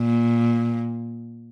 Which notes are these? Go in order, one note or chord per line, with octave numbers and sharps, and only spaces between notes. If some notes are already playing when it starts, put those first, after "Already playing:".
Already playing: A#2